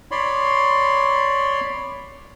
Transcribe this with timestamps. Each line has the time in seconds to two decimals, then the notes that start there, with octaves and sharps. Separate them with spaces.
0.11 C#5 D5 B5 C6